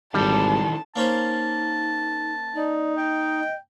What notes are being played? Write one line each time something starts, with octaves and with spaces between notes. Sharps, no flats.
G#1 D#3 E3 G3 A4 A5
A#3 C#4 D#4 C5 A5
D#4 D5
D#5 G5